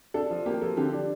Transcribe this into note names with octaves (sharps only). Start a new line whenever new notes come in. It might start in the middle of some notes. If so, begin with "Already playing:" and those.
D4 A4
F3
A#3 G4
F3 A4
D3 G4
D4